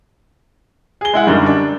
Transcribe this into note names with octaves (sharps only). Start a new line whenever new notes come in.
G#4 G7
G#3 E4 F#5
F#2 D3 D#3 G3
D4